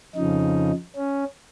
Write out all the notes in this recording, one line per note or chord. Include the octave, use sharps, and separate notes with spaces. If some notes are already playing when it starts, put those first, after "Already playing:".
F2 C#3 F3 D#4
C#4